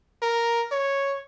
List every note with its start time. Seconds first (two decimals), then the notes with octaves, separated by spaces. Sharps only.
0.22 A#4
0.72 C#5